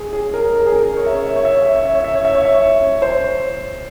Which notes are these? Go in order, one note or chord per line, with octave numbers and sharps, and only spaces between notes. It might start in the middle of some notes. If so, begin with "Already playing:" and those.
Already playing: G#4
G#4
A#4
A#4
G#4
A#4
C#5
E5
C#5
E5
C#5
E5
C#5
E5
C#5
E5
C#5
E5
C#5
E5
C#5
E5
C#5
C5